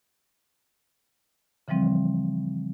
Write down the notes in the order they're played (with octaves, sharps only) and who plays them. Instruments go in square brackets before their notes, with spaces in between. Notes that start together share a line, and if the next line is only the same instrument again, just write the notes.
[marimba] C#3 E3 F3 G3 C4